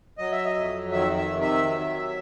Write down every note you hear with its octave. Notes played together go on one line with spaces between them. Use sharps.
F#3 D#5
E5
D#5
F2
D#3 E5
E5
C3
E5
F#3